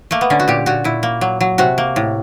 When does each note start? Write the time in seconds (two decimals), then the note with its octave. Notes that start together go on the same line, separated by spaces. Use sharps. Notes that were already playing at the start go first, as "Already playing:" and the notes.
0.11 A3 A#3
0.21 B3
0.30 D3 C#4
0.40 F#4
0.48 A#2 G4
0.66 A#2 F#4
0.84 A#2 E4
1.03 A#3
1.21 F#3
1.41 F#3
1.58 C3 F#4
1.78 A#3
1.96 A2